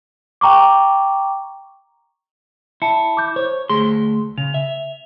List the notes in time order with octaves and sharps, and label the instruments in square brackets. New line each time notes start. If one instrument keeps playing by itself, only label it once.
[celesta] G5 A#5 C#6 D6
[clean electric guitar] E4 [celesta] A5 C#7
[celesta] D6 G6
[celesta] C5 [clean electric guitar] C#5
[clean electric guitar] D2 A3 C6 [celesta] G#4
[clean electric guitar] C#3 [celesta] F7
[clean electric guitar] E5